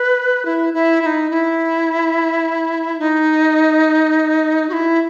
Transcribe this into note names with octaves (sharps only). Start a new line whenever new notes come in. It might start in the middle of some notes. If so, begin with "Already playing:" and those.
Already playing: B4
E4
E4
E4
D#4
E4
D#4
F#4
E4